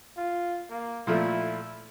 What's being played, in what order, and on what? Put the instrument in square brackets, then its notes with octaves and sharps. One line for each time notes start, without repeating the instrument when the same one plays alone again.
[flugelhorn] F4
A#3
[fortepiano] A#2 F3 A3 [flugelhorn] E4